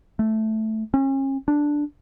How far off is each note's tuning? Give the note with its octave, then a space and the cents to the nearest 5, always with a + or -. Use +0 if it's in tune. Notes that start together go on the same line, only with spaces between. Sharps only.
A3 -5
C#4 -35
D4 +0